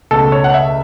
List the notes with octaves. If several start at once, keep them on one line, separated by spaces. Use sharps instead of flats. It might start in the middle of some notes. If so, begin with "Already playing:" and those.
C#2 B2 A3 A4
C#5
F#5
E5